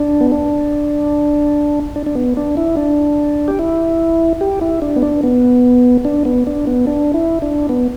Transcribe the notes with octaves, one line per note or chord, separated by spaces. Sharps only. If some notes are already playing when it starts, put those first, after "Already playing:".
Already playing: D4
B3
D4
D4
D4
B3
D4
E4
D4
G4
E4
G4
E4
D4
B3
D4
B3
D4
B3
D4
B3
D4
E4
D4
B3